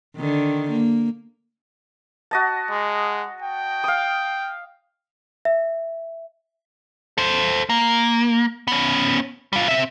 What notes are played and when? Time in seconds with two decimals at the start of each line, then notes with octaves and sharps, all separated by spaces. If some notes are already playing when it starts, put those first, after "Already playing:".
0.16 D3 D#3
0.70 A#3
2.31 F#4 D#5 A5
2.70 G#3
3.42 G5
3.84 F5 D#6
5.45 E5
7.18 A4 C5
7.69 A#3
8.68 B3 C#4
9.53 G3 F4
9.69 C4 E5